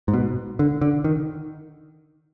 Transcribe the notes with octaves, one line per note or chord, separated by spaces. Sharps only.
G#2
B2
D3
D3
D#3